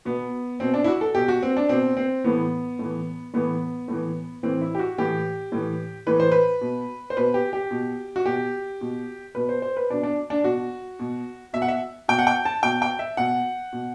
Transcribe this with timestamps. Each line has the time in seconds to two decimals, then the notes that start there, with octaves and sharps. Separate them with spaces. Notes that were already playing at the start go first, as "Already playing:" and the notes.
0.05 B2 B3
0.60 B2 C4
0.74 D4
0.84 E4
0.88 F#4
1.01 A4
1.15 B2 G4
1.28 F#4
1.43 C4
1.57 D4
1.69 B2 C4
1.97 C4
2.24 A2 E3 B3
2.79 A2 E3
3.34 A2 E3 B3
3.88 A2 E3
4.43 A2 E3 C4
4.61 E4
4.75 G4
4.79 F#4
4.98 A2 E3 G4
5.52 A2 E3
6.07 A2 E3 B4
6.20 C5
6.32 B4
6.61 B2
7.10 C5
7.17 B2 B4
7.34 G4
7.53 G4
7.71 B2
8.16 F#4
8.26 B2 G4
8.81 B2
9.35 B2 B4
9.49 C5
9.62 C5
9.77 B4
9.90 B2 D4
10.03 D4
10.30 D4
10.44 B2 F#4
10.99 B2
11.53 B2 E5
11.62 F#5
11.68 E5
12.08 B2 G5
12.19 F#5
12.27 G5
12.45 A5
12.63 B2 G5
12.82 G5
12.99 E5
13.17 B2 F#5
13.73 B2